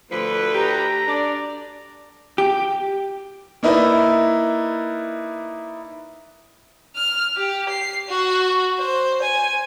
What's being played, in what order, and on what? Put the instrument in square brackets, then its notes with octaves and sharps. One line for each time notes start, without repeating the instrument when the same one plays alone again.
[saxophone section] D2 B4 [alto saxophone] F3
[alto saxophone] G4 [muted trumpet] A#5
[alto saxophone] D4 [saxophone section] A4 D5
[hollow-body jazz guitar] G4
[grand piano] A#3 D#4 E4 B4 D5 E5
[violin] F6
G4
C7
F#4
C5
G#5